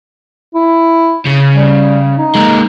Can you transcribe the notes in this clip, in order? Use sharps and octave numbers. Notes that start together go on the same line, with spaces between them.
E4
C#3
G3
D#4
G#3 A#3